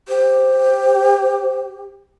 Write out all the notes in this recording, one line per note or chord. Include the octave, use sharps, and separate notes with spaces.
G4 C5